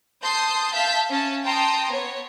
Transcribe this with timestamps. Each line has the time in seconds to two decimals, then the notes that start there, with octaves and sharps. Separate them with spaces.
0.21 A5 C6 D#6 G6
0.74 E5 F5 A5 G6 B6
1.10 C#4 A5
1.43 G5 A5 A#5 C6 D#6
1.90 B3 C#5